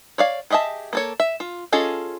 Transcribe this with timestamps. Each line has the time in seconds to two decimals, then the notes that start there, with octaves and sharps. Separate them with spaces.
0.18 C#5 D5 F5
0.50 G4 G#4 D#5 E5 A5
0.93 A#3 A4 C#5
1.20 E5
1.40 F4
1.72 C#4 F4 G#4 A4 D#5